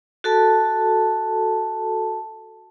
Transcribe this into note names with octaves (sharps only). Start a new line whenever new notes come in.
F#4 A4 A5